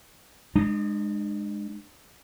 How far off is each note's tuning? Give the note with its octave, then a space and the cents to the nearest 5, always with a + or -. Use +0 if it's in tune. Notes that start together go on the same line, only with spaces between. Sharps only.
G#3 +0 D4 +45